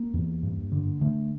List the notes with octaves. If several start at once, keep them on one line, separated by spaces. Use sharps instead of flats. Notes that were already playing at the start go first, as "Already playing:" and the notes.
Already playing: A#3
E2
G2
D3
D3 A3